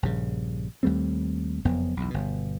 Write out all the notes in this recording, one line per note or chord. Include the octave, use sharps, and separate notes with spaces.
A#1 G2 C#3
D#2 G3 A3 C4
F#1 F2 B3
B1 E2
G1 B2